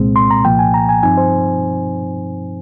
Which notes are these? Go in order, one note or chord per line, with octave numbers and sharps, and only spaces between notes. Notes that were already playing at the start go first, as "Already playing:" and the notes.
Already playing: C2 A#2 G#3 C4
C6
A#5
C2 A#2 F3 A#3 G5
G#5
A#5
G#5
G2 F3 C4 D#4 G#5
C5